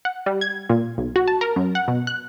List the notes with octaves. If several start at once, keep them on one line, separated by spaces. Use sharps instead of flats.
F#5
G3
G#6
A#2
B1
F#4
A5
A#4
F#2
F#5
B2
F#6